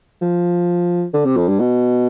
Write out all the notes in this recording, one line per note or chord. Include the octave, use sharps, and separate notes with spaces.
F3
D3
C3
F2
G2
B2